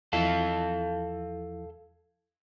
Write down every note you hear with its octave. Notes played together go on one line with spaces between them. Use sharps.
E2 F3 E4 A4 F5 A5